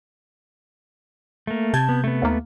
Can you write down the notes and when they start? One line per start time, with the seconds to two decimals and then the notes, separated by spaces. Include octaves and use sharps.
1.47 A3 A#3
1.74 C3 A5 G6 G#6
1.89 B3
2.04 A3 B3
2.22 D#2 A#3